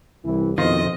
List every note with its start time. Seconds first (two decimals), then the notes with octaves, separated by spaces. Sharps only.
0.25 C2 E3 G3
0.58 F2 B2 D#3 F4 C5 D#5